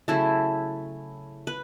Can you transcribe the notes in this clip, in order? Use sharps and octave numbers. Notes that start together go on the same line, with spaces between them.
C#3 F#3 A3 E4
B4